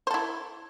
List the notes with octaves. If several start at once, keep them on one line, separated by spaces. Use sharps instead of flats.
E4 A4 C5